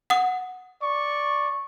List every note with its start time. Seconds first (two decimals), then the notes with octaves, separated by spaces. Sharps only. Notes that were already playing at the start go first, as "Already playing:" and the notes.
0.10 F#5 D#6
0.82 D5 C#6